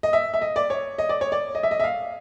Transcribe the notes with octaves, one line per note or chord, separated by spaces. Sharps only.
D#5
E5
E5
D#5
D5
C#5
D#5
D5
C#5
D5
D#5
E5
D#5
E5
F5